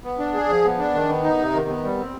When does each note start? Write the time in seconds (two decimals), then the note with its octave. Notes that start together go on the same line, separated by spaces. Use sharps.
0.04 B3
0.19 D4
0.34 G#4
0.49 F3
0.64 B3
0.78 D4
0.94 D#3
1.08 B3
1.23 D#4
1.39 C3
1.53 D#3
1.68 B3
1.84 G3
1.98 C4